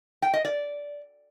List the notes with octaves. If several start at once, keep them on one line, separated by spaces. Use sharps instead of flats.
G5
D#5
D5